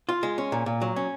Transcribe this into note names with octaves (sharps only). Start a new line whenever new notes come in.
F4
G#3
C#4
A#2
A#2
F#3
C#4